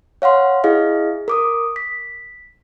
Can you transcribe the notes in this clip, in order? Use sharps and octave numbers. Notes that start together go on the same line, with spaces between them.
C#5 F5 F#5 C6
E4 G#4 D#5 F5
A#4 D6 D#6
B6